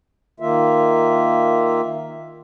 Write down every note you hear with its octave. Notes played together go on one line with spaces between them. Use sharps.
D#3 A#3 F4 E5